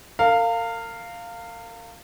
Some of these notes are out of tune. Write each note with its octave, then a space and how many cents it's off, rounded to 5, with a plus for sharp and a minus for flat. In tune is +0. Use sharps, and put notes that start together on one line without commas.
A#4 -40 F5 -5